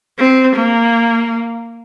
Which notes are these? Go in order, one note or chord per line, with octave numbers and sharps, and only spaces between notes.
C4
A#3